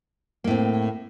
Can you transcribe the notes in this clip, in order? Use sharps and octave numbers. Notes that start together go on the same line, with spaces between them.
A2 A#3 C4